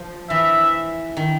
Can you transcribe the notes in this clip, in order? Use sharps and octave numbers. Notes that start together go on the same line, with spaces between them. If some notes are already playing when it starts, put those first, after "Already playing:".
Already playing: F3
E3 E5
D#3